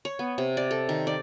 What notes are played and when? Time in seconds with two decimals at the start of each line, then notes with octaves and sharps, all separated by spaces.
0.05 C#5
0.19 B3
0.38 C3
0.57 D5
0.71 A4
0.89 D#3
1.07 D5